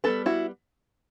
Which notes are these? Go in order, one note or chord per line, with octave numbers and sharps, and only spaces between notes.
G3 B3 D4 A4 B4
E4 F#4